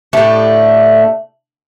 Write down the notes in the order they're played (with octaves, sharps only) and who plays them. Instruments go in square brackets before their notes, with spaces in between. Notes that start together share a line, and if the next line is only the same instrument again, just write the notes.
[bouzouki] A2 A3 D4 G4